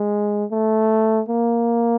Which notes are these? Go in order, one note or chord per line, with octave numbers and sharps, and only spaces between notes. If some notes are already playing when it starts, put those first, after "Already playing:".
Already playing: G#3
A3
A#3